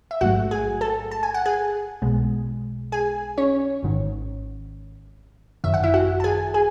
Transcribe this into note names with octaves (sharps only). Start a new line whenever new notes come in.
E5
A1 G#2 F#3 A3 F#4 F#5
G#4 G#5
A4 A5
A5
G#5
F#5
G#4 G#5
B1 B2 G#3
G#4 G#5
C#4 C#5
G#1 G#2 D#3
G#1 F#2 D#3 E5
F#5
E4 E5
F#4 F#5
A5
G#4 G#5
G#4 G#5